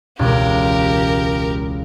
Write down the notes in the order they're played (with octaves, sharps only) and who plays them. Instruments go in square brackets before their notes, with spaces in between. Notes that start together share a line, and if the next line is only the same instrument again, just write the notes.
[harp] E1 C#2 [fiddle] G4 A#4